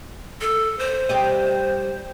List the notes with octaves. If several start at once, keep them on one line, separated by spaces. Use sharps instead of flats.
A4
C5
G3 G4 D#5